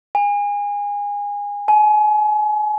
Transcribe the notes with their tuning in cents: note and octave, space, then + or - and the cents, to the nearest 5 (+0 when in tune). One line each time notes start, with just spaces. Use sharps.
G#5 -25
G#5 +35